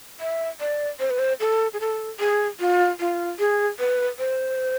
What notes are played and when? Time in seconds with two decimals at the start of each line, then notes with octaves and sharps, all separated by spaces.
0.20 E5
0.61 D5
1.00 C5
1.10 B4
1.19 C5
1.40 A4
1.73 G#4
1.81 A4
2.19 G#4
2.60 F4
3.00 F4
3.39 G#4
3.79 B4
4.19 C5